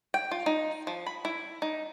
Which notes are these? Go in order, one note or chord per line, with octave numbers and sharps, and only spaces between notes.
G5
F4
D#4
F3
B5
E4
D#4